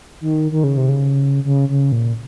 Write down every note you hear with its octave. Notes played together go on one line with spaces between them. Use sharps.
D#3
D#3
C#3
C3
C#3
C#3
C#3
A#2